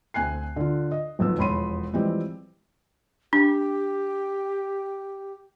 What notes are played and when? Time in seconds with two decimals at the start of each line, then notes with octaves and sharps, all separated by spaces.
0.14 D2 C4 G#5 F#6 C7
0.56 D3 F4
0.92 D#5
1.19 B1 F2 F3 B3 E6
1.38 E1 F2 C#5 B5 C6 D#7
1.93 E3 F3 G3 G#3 C4
3.33 D4 G4